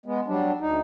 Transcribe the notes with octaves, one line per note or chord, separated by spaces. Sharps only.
G#3 B3
F#3 G3 D4
D2 D#4